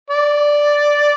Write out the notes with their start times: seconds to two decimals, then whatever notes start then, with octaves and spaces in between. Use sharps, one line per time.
0.10 D5